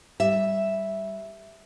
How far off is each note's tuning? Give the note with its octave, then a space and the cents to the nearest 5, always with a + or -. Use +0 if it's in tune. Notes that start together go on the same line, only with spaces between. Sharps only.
G3 +0 E5 +0